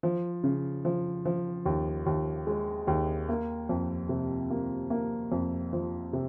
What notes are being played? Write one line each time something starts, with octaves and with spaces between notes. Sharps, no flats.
F3
C#3
F3
F3
D#2
D#2
G#3
D#2
A#3
F2
C3
A#3
A#3
F2
F3
C3